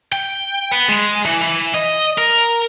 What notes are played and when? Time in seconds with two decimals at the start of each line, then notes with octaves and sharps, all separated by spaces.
0.12 G5
0.71 B3
0.89 G#3
1.26 E3
1.42 E3
1.74 D#5
2.18 A#4